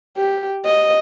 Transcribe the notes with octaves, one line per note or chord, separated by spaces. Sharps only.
G4
D#5